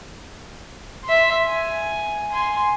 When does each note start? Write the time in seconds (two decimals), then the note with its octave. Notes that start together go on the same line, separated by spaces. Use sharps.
1.04 E5 C6
1.48 G#5
2.32 G#5 C6